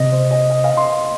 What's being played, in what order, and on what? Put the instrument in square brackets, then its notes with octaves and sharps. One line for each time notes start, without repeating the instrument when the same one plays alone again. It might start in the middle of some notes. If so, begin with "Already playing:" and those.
Already playing: [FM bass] C3 [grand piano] D#5
[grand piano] C5
D#5
D#5
F5
C6